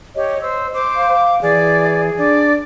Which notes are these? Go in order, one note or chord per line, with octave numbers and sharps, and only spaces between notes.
G4 C#5 D#5
C5 E6
C5 D6
F5
E3 G#4 D5
D4 D5